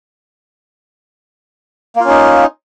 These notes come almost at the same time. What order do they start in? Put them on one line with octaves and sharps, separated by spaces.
A#3 F4 C#4 D#4